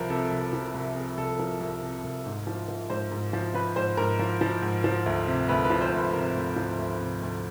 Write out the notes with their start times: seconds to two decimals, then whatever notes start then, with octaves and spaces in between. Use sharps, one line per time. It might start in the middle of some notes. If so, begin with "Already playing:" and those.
Already playing: C2 F3 A#4 B4
0.10 C3 A4
0.31 C2
0.53 F3
0.75 C2
0.95 C3 G#4
1.17 C2 A4
1.39 F3 A#4
1.61 C2
1.82 C3
2.04 C2
2.26 G#2
2.47 F3
2.68 F3
2.90 G#2 C5
3.11 G#2
3.33 F3
3.54 F3 B4
3.76 G#2 C5
3.97 G#2 A#4
4.19 F3
4.41 F3
4.62 G#2
4.84 F3
5.06 D2
5.27 C3
5.49 D2 B4
5.64 B4
5.70 F3
5.81 C5
5.92 D2
5.97 B4
6.13 C3 A#4
6.35 D2
6.56 F3
6.78 D2
7.00 C3
7.21 D2